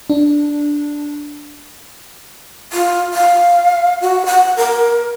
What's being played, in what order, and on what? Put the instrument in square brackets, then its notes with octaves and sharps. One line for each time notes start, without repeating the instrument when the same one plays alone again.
[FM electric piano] D4
[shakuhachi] F4
F5
F#4
F#5
A#4